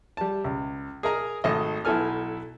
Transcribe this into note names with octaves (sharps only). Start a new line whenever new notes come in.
G3 A5
C#2
G#4 A#4 D#5 A#5
G#1 A3 D#5
B1 B3 E4 A4 G#5 F6